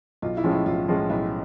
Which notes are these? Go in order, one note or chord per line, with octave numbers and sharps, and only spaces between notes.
B1 F4
E4
A2 F3 G#3 C#4
E4
B1 F4
A2 F3 G#3 C#4
B1 E4